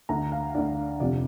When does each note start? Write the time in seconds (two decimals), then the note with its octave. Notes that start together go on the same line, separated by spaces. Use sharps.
0.09 D2 D3 A#5
0.32 F5
0.55 D2 D3 D5
1.00 F1 F2 C3 D5